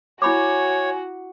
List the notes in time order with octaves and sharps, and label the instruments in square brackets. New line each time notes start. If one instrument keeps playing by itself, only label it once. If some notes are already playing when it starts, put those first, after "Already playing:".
[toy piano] E4 B5 D6 [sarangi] F#4 [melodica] C#5 [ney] G#5